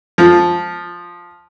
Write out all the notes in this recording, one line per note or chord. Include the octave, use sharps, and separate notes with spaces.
F3